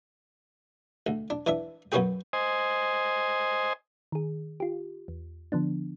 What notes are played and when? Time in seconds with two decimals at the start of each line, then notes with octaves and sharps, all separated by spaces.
1.07 D2
1.30 D4
1.46 E3 D4 E5
1.92 F#2 B3 C#4 F#4 G#4 G5
2.33 C5 D#5 G#5
4.12 D#3 G#4
4.60 F4 G4
5.08 E2
5.52 D3 F3 B3 D4